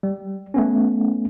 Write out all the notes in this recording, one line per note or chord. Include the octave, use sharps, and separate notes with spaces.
G3
A3 B3 C#4